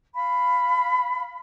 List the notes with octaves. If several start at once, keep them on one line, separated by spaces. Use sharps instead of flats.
F5 B5